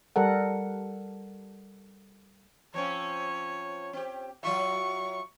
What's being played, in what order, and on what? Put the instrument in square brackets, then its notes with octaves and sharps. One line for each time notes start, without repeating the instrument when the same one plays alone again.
[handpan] G3 A4 A#4 F#5
[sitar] F3 C4 C#4 [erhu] C#5
[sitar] C4 G4
[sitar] F#3 F4 E5 [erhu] C#6